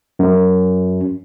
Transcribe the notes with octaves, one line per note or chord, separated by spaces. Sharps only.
F#2